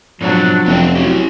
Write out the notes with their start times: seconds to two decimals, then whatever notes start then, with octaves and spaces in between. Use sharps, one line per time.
0.21 G#2 B2 F3 F#3 C4 D4
0.66 F1 B3 C#4 G5
0.95 F#3 C#4 E4 G4